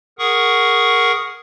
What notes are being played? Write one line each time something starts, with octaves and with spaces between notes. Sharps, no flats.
G#4 A#4 F#5 C#6 D#6